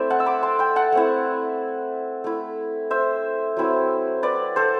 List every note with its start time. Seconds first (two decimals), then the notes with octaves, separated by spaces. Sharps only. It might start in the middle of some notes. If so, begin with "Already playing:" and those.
Already playing: A3 C4 E4 C5 D5 E5
0.10 F#5 A5
0.20 E6
0.26 B5 D6
0.43 A5 C6
0.59 G5 B5
0.76 F#5 A5
0.92 A3 C4 E4
2.24 A3 E4
2.91 C5 E5
3.57 F#3 C4 E4
4.23 B4 D5
4.56 A4 C5